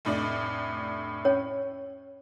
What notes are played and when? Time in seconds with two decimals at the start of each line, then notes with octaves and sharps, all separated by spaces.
0.05 F1 A2 D4
1.25 C#4 C#5 G5